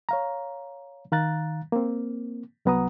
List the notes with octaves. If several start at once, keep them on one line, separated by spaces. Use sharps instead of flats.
C#5 F5 A#5
D#3 F5 A#5 F#6 A6
A#3 C4
C2 F#3 B3 F#5 A#5 D#6